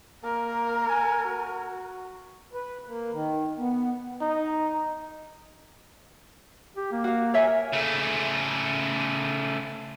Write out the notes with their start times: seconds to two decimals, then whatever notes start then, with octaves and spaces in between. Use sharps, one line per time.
0.24 A#3 A#4
0.89 G#5
1.25 F#4
2.53 B4
2.87 A#3
3.12 D#3
3.58 B3
4.21 D#4
6.77 G4
6.92 A#3
7.04 F#4 F5
7.34 C#5 E5 G#5
7.47 A#4
7.73 C#3 A3